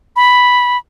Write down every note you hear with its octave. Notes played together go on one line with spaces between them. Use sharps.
B5